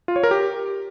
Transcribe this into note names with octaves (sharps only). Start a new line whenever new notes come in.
F4
C#5
A#4
G4